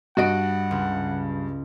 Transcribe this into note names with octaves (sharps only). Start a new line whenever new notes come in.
G2 F#4 D#5 F#5 D7
C#2